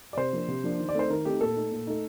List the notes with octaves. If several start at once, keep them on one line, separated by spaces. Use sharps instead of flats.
D5
C3 C5
F3 A#3 D4
C3
F3 A#3 D4
D#3
D5
A3 C4 D#4 C5
D#3 A#4
A3 C4 D#4 G4
A#2 A4
A3 D#4
A#2
A3 D#4